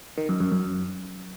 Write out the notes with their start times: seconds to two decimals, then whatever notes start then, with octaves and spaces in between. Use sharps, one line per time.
0.18 D#3
0.29 F#2
0.40 F#2
0.52 F#2